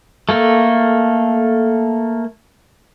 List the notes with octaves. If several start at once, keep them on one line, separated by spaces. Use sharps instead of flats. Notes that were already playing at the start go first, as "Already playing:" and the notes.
A3 A#3 A4